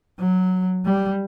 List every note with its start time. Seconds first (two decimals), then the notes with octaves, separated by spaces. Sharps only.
0.19 F#3
0.85 G3